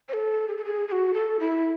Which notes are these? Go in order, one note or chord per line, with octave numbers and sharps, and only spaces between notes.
C#5
A4
G#4
A4
G#4
G#4
F#4
A4
E4